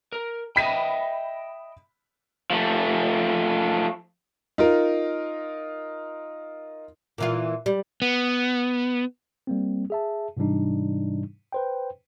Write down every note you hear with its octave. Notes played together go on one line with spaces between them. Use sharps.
A#4
D#5 E5 G5 B5 B6 D#7
F3 A3
D#4 F4 A#4
A#2 E3 F4
G3
B3
G3 A#3 C4
G#4 E5 A5
G#2 C3 E3 G3 D4 D#4
B4 C5 G5